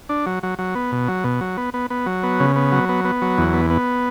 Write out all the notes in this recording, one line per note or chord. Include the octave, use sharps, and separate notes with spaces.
D4
F#3
F#3
F#3
B3
B2
F#3
B2
F#3
B3
B3
B3
F#3
B3
C#3
B3
F#3
B3
B3
F#3
E2
B3
B3